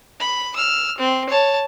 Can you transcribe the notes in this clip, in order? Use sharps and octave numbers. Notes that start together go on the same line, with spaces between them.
B5
E6 F6
C4
C#5 A5